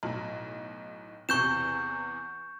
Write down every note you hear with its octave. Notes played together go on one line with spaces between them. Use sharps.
B1 A2
E2 C3 C#6 G6 E7